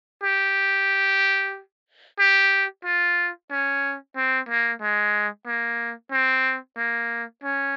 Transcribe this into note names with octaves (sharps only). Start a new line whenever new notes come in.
G4
G4
F4
C#4
C4
A#3
G#3
A#3
C4
A#3
C#4